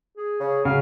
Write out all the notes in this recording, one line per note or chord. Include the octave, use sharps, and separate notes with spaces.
G#4
C#3
C#3 F#3 F5